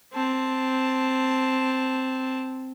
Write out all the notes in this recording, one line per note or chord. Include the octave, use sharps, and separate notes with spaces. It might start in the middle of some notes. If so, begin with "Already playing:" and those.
C4 A5